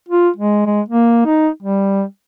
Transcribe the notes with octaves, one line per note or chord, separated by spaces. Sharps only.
F4
G#3
G#3
A#3
D#4
G3